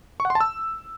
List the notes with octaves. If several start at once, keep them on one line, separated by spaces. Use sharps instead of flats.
C#6
F#5
C6
A5
E6